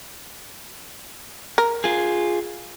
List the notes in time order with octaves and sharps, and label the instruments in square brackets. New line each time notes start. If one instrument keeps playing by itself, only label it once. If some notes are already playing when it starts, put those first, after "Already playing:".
[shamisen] A#4
[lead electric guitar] F4 G#4